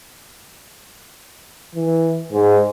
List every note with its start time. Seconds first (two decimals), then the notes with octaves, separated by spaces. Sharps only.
1.75 E3
2.33 G#2